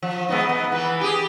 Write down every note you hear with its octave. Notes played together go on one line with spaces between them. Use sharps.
F3
G#3 B3 D#4
B3
E3 B4
G4 G#4